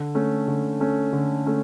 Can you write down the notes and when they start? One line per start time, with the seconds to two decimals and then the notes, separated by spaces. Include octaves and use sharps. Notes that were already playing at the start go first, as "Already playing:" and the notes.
Already playing: D3
0.15 A3 C#4
0.48 D3
0.80 A3 C#4
1.13 D3
1.46 A3 C#4